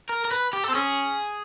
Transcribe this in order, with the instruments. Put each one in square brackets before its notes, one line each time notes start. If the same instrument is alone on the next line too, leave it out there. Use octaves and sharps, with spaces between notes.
[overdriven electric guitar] A#4
A#4
B4
G4
[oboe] C4 [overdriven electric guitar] A4
[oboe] C#4 [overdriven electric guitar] G#4